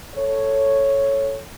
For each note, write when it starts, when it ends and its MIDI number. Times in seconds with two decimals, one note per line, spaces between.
0.16 1.39 69
0.16 1.39 73